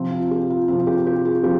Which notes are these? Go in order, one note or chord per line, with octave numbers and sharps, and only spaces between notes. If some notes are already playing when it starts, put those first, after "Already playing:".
Already playing: C3 F3 C4
F4
G4
F4
C3 F3 C4 F4
F4
G4
G4
F4 G#4
F3 C4 G4